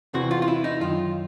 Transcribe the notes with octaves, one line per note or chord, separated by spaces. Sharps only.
E2 C3 E3 F#4
F4
F4
E4
D#4
F#2 D#3 F4